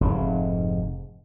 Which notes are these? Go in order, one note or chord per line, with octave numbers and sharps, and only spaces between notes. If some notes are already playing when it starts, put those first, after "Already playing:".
F1 G#2